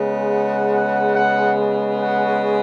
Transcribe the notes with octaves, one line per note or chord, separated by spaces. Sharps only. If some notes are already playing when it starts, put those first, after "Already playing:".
Already playing: C#3 G#3 B3
F#5
F#5
F#5
F#5